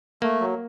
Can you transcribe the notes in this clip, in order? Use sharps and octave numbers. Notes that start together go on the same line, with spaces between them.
A3 A#3
F#3